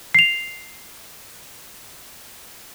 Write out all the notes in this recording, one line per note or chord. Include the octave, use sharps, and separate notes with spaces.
C7 F7